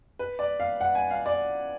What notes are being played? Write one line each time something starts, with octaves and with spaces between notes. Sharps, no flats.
B4
D5
F5
F#5
G#5
F5
D5